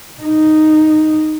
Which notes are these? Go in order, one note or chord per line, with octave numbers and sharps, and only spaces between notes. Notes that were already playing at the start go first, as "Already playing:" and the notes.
D#4